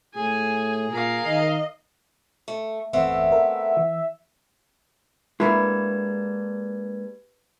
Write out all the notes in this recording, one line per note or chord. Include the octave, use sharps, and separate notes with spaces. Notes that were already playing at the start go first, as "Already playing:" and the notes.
A2 G#4 G#5
A#2 A#4 F5
D#3 D#5
A3
G1 E2 A3 B3 C4 E5 F#5
A#4
E3
G#3 A#3 D4 E4 G4 B4 G#6